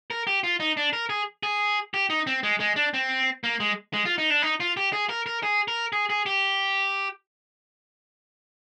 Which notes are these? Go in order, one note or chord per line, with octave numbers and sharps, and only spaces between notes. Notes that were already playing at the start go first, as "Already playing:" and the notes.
A#4
G4
F4
D#4
D4
A#4
G#4
G#4
G4
D#4
C4
G#3
G#3
D4
C4
A#3
G#3
G#3
F4
D#4
D4
D#4
F4
G4
G#4
A#4
A#4
G#4
A#4
G#4
G#4
G4